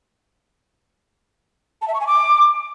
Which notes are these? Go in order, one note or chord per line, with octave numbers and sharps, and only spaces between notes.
A5
E5
C#6
G#5
D6